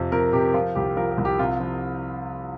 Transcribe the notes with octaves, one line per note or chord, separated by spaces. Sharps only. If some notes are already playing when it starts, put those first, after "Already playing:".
Already playing: F2 C3
F2 A#4
C3 G4
F3 F4
C2 G4
F3 A#4
A#4
C2
G4
C3 F4
F3